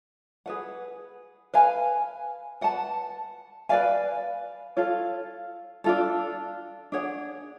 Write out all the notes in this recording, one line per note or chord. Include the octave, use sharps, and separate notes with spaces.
G#4 B4 F#5
B4 F5 G#5
B4 F#5 A5
B4 D5 F5 G#5
F4 A4 C#5 F5
D4 F4 A4
D4 G#4 C#5 F#5